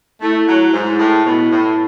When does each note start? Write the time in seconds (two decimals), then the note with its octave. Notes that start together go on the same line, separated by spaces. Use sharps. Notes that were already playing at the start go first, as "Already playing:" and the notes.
0.21 A3 E4
0.47 F#3
0.72 G#2 E4
0.99 A2
1.24 B2 E4
1.51 A2